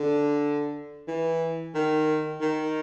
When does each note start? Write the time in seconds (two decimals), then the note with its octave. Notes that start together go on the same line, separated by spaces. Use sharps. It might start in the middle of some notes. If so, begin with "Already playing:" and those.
Already playing: D3
1.08 E3
1.75 D#3
2.41 D#3